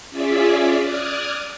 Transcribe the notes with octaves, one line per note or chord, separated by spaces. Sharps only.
C#4 F4 G#4 D5 E5 B6
D5 D#6 F6 F#6 G#6